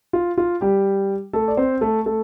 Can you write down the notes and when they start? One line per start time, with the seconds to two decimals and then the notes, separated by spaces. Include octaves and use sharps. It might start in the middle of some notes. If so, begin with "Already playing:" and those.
0.13 F4
0.38 F4
0.61 G3 G4
1.33 A3 A4
1.48 D5
1.57 C4 C5
1.81 A3 A4
2.06 A3 A4